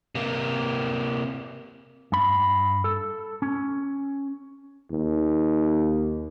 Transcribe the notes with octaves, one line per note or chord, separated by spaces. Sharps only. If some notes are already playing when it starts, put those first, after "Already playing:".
C3 A#3
G2 B5
A4
C#4
D#2